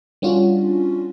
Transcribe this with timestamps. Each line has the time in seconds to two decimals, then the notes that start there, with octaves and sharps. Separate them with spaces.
0.22 G3 C#4 D4 F4 F#4